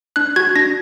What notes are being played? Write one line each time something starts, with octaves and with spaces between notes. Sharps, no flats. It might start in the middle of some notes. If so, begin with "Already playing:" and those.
D4 F#6
F#4 G#6
D4 A#6